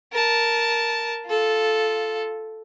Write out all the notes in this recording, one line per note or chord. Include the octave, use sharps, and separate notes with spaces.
A#4 A5
F4 A4